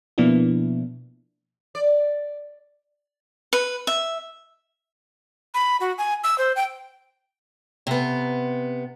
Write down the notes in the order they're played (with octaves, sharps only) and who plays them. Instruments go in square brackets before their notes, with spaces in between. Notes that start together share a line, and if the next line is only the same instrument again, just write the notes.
[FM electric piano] B2 F3 A#3 B3 D4 E4
[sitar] D5
[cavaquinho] B4
E5
[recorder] B5
F#4
G#5
E6
C5
G5
[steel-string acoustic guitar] C3 B3